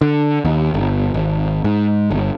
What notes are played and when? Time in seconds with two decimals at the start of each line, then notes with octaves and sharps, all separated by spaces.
0.01 D3
0.45 D#2
0.74 G1
1.14 G#1
1.64 G#2
2.11 G1